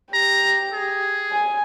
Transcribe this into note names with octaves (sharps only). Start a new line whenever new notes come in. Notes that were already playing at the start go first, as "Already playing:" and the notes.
G4 A#5
G#4
G#5